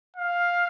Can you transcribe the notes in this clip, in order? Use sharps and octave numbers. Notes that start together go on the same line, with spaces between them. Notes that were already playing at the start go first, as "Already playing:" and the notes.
F5